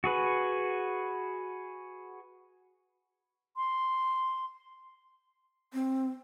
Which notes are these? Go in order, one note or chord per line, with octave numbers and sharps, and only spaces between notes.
F#4 G#4 B4
C6
C4